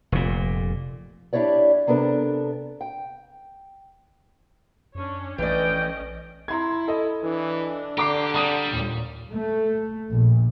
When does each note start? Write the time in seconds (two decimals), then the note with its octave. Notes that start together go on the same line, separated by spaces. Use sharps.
0.12 F1 A#2
1.33 D4 E4 G4 C#5 D5
1.87 C3 B3 D4 A4 A#4
2.81 G5
4.95 F#2 C#4 D4 C#5
5.38 A#1 E3 A3 C#4 D5 D#5 G5
6.48 E4 A#5 C6 G#6
6.88 A4 D#5
7.23 E3 D4
7.98 D3 G4 A#5 D6 C7
8.35 G3 A#5 D#6 D#7
8.68 D#2 A#2
9.33 A3
10.11 A#1